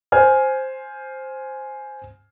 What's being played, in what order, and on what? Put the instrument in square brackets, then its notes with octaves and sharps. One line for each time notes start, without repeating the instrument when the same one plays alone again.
[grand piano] C5 G#5 F6